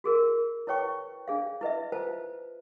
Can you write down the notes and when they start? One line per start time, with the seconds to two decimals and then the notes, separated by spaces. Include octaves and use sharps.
0.04 F#4 G#4 A#4
0.67 E4 B4 C#5 G5 C#6
1.28 D4 G#4 F5
1.61 E4 B4 D#5 E5
1.92 F4 B4 C5 A5